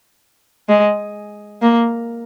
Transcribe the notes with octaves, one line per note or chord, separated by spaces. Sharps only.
G#3
A#3